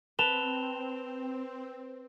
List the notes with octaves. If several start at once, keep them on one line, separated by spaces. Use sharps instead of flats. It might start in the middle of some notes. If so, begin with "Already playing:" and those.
C4 B4 A5 E7 F7 G7